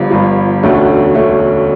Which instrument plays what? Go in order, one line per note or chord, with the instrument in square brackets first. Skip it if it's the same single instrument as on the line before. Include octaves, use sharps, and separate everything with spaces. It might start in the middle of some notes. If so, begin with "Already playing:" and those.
Already playing: [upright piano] G1 G2 F3
G1 G2 F3
E1 D2 D3 A3 C#4
D3 A3 C#4